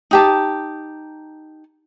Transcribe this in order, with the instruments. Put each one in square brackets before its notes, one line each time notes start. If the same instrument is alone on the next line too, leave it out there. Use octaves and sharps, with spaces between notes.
[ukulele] D#4 G4 A5